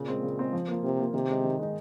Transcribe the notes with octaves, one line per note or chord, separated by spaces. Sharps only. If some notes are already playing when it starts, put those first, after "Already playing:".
Already playing: A#2 C#3
G#3 C4
C#3
G#3 C4
F3
A#3 F4
C3 F3
A#3 F4
C3 D#3
G#3 D#4
D#3
G#3 D#4